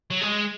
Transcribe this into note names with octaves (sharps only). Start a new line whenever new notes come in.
F#3
G#3